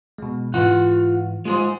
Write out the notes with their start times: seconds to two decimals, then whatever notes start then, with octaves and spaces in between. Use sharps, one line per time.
0.18 B2 G#3
0.54 G#2 E3 F4 F#5
1.45 G#3 F4 G#4 C5